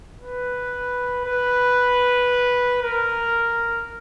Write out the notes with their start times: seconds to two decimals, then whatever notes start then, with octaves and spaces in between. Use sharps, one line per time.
0.20 B4
1.25 B4
2.82 A#4